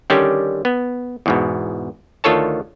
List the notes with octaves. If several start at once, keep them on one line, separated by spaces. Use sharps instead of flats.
D3 D#3 G3 C#4 D4 G4
B3
E2 G#2 B2
D2 D#3 F4 A4 C#5 A5